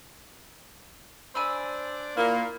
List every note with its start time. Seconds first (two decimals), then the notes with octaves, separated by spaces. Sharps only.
1.35 D4 C5 D5 G#5 B5 E6
2.17 A#2 A#3 E4 F5